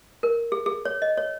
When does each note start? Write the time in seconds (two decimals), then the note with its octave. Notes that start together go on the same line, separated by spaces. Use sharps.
0.23 A#4
0.52 G#4
0.66 G#4
0.85 C#5
1.02 D#5
1.17 C#5